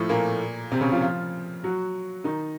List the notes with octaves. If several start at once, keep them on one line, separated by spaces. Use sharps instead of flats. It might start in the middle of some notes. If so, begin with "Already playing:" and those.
Already playing: A2 F3 A3
A#2 A#3
C3 C4
C#3 C#4
F3 F4
F3 F4
F#3 F#4
D#3 D#4